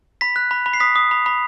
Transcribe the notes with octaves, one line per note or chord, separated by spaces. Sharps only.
B5 B6
F#6
B5
B5
C7
D#6 B6
D#6
B5
B5